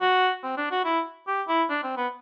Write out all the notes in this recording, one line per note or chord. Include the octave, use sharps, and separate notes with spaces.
F#4
C4
D4
F#4
E4
G4
E4
D4
C4
B3